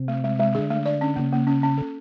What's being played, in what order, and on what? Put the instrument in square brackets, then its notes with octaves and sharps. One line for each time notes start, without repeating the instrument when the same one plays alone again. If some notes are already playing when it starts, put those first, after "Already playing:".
Already playing: [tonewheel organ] C3
[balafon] A3
G#3
G#3
[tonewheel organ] D3 [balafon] G#4
[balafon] A3
D5
C#4
[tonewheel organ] C#3 [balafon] A#3
[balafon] A#3
C#4
C#4
A4